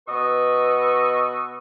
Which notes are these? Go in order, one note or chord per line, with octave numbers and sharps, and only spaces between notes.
B2 B3 B4 D#5 C#6 E6